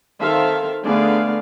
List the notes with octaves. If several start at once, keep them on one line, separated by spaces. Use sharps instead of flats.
D#3 C4 A4 C5 E5 F5
D3 A3 B3 G#4 D5 F5